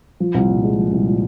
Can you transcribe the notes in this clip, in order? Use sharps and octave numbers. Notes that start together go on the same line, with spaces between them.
F3
C2
A#2
G#3
F3
C2
A#2